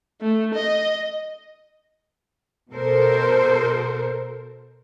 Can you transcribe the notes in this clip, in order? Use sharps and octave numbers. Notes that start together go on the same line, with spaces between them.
A3
D#5
B2 A4 A#4 C5